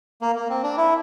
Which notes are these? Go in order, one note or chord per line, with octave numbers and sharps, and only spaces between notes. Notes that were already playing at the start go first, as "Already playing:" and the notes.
A#3
A#3
C4
D4
E4